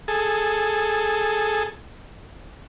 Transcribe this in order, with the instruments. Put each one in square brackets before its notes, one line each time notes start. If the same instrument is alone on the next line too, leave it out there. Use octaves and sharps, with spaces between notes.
[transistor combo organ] G#4 A4